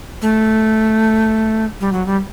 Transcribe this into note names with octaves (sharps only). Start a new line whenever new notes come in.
A3
G3
F#3
G3